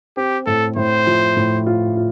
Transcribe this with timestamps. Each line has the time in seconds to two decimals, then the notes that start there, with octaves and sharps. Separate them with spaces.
0.17 C4 G4
0.46 A2 A4
0.76 A2 C5
1.07 F3
1.37 A2
1.66 F4
1.97 F4